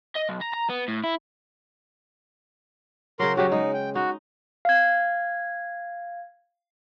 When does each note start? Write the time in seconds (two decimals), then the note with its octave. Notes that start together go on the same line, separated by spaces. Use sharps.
0.15 D#5
0.29 B1
0.41 A#5
0.54 A#5
0.69 B3
0.88 A2
1.04 E4
3.19 C#3 F#3 A#4 C6
3.37 C#3 F#3 F#4 G4
3.52 G#3 D#4
3.74 G5
3.95 D#4 F#4
4.65 F5 G#6